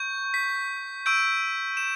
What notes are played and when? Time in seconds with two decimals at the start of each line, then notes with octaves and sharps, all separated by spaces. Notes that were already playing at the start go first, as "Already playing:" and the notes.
Already playing: C#6 G6
0.34 B6
1.06 C#6 E6 G6 D7
1.77 E7